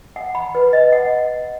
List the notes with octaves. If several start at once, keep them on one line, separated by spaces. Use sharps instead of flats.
F#5
B5
B4
D#5
F#5